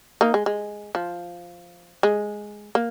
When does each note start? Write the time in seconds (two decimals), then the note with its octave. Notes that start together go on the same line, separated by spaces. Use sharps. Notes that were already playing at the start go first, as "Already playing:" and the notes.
0.21 A#3 D#4
0.34 G#3
0.46 G#3
0.95 F3
2.03 G#3
2.75 A#3